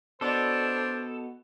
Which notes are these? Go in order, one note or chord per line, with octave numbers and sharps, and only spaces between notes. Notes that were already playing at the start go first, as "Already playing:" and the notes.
B2 B3 D4 A4 C5